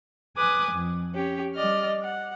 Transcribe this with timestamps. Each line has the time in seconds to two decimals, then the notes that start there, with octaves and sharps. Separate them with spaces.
0.36 B4 G#5 D6 D#6 F#6
0.71 F2
1.14 C#4 G4
1.55 G3 D5 D#5 F6
2.02 F#5